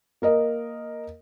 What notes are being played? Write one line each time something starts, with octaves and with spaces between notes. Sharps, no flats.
A#3 A#4 D#5